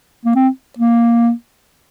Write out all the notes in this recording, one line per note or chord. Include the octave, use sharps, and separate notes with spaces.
A#3
C4
A#3